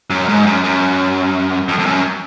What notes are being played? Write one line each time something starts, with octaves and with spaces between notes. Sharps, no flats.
F#2
G#2
F#2
F#2
F2
F2
F#2